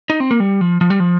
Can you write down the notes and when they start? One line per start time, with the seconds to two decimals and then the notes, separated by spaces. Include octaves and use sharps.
0.10 D#4
0.20 C4
0.31 A#3
0.40 G3
0.61 F3
0.81 F3
0.90 G3
1.00 F3